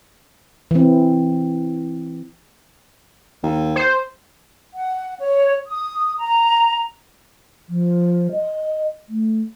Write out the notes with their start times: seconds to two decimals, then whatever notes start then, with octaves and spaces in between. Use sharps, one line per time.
0.71 E3 C4
3.43 D#2
3.76 C5
4.74 F#5
5.19 C#5
5.67 D#6
6.19 A#5
7.69 F3
8.32 D#5
9.08 A3